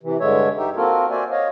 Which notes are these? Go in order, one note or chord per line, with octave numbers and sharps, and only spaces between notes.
C3 E3
G2 D3 G#3 C#5 E5
D#4 G4 E5
A#3 C4 F4 F#4 A4 A#4
F#4 C5 D5 E5 G#5
C#5 D#5 F5